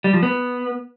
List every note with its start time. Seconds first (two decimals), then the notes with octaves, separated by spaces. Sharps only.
0.04 G3
0.13 F3
0.23 B3